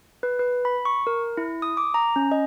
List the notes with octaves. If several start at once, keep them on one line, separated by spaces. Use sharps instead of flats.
B4
B4
B5
C#6
A#4
E4
D#6
D6
A#5
C#4
D#5